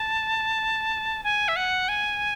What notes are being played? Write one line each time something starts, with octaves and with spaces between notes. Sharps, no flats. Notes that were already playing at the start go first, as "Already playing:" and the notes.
Already playing: A5
G#5
E5
F#5
G#5